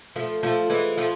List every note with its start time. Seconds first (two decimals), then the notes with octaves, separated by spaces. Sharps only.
0.16 F3 A3
0.43 F3 A3
0.70 E3 G#3
0.97 F3 A3